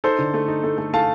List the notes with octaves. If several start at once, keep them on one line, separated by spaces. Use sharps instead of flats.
D#4 A4 C5
D3
A3
D#4
A3
A3
A3 F5 A5